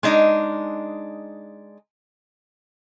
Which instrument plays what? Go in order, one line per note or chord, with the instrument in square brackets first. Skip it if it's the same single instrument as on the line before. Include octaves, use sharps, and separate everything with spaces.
[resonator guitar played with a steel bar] G#3 D4 D#4